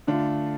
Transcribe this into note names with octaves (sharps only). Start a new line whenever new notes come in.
D3 A3 D4 F4